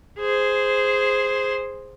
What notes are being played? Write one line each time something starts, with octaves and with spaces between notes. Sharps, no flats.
G#4 C5